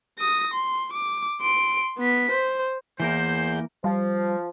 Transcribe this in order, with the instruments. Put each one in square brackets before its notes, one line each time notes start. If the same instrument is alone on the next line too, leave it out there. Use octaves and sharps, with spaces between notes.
[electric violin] D#6 A#6
C6
D6
C6 D7
B3 B6
C5
[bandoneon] E2 G6 [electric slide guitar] E3 A#3 A#4 [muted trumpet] C5
[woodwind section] F3 [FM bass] G3